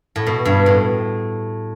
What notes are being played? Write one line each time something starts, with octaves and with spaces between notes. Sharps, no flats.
A2
B2
G2
A2